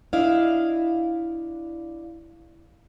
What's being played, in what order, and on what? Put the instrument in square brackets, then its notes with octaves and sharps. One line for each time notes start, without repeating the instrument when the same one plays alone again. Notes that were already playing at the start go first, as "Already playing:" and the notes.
[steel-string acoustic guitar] D4 E4 D#5 F5